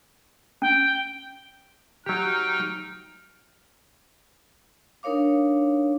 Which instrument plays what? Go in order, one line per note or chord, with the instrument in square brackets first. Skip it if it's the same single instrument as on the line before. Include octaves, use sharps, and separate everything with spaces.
[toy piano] C#4 [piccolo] G5
[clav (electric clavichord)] F#3 G4 [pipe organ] D#4 G5 [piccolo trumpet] F6
[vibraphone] D4 D#4 A#4 C#5 F5 D6